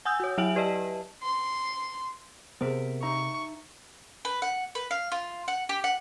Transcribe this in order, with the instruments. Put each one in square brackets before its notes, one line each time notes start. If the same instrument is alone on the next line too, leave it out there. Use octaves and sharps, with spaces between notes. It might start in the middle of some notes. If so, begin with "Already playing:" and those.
[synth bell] F#5 G#5 D#6 E6 G6
F#4 C#5
F#3 E4 E5 G#5 D7 F#7
G4 B4 D5 D#5 A5
[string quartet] C6
[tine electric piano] C3 [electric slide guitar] B3 A#4 E5 [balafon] G#4 C5
[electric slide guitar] D#4 E5 A#5 [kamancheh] C#6
[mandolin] B4
F#5
B4
F5
F4
F#5
G4
F#5